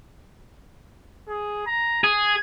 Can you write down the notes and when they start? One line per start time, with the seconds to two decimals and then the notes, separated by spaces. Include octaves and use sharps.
1.29 G#4
1.67 A#5
2.04 G#4 G#6